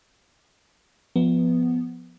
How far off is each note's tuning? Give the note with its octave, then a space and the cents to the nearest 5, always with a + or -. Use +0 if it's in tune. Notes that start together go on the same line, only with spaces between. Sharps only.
F3 +0 B3 +0